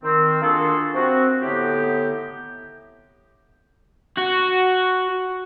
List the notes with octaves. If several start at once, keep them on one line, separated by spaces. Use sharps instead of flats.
D#3 C4
A#3 D4 F4 F#4 G#4 A4
C4 F#4
A2 D3 B3 D#4 G4
F#4